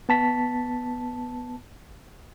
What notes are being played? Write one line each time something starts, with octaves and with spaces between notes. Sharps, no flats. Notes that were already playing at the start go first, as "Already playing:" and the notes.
B3 A5 B6